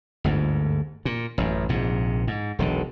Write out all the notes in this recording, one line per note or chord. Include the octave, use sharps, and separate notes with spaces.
G1 D2 G#2
A#2
A1 F#2
A#1 G#2 C3
G#2
E1 B1 D3